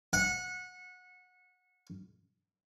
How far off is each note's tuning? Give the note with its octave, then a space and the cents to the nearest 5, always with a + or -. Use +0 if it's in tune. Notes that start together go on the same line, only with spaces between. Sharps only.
F#5 -20